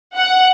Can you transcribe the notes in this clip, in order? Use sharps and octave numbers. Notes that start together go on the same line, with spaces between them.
F#5